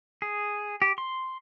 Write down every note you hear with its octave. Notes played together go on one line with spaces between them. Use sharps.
G#4
G4
C6